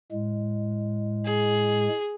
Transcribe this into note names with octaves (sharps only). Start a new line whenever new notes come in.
A2 G#3
G#4